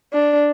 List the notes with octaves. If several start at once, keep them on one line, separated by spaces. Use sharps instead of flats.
D4